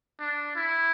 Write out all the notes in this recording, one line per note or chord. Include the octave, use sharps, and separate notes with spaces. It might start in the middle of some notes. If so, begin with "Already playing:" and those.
D4
E4